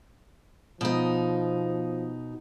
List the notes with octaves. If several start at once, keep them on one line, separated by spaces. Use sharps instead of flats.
B2 F3 D#4